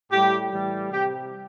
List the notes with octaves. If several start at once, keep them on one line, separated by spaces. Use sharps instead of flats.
A2 G3 G4
A2 E3 G3
C3 G3 G4